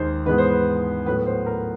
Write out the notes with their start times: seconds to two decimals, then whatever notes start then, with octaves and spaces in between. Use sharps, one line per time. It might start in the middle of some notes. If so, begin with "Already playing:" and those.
Already playing: D#2 D#3 G#3 C5
0.26 G#2 E3 G#3 B3 B4
0.38 C5
0.50 B4
1.06 A2 F#3 B3 B4
1.26 C5
1.46 A#4